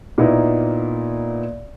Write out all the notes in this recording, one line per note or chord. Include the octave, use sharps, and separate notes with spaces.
A#2 A#3 B3 D#4 E4